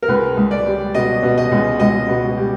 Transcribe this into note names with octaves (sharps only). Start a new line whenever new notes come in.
A#4
C#2 B4
C#2
D5
G3
B2 D#5
B2
D#5
C#2
C#2 D#5
B2
G3